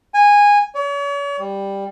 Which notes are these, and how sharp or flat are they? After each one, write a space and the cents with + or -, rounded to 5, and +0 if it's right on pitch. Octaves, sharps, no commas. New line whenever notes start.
G#5 -15
C#5 +40
G3 +5